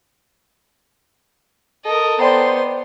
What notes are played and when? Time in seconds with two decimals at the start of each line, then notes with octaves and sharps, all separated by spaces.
1.86 A4 A#4 D#5
2.20 B3 C5 D5 G5 A#5 C6